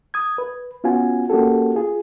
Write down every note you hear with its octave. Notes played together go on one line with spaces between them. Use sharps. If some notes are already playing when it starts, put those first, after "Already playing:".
D#6 G#6
B4
B3 C#4 F4 F#4 G#5
A#3 C#4 F#4 G4 A4
F4 G#4